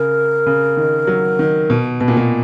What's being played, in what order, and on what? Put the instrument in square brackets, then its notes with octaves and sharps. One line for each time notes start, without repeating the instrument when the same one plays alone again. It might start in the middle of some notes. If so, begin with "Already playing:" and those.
Already playing: [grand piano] C#3 [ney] A#4
[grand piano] C#3
D#3
F#3
D#3
B2
B2
A#2
B2